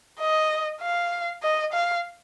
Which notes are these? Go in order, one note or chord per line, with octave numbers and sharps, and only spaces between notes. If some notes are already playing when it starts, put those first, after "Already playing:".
D#5
F5
D#5
F5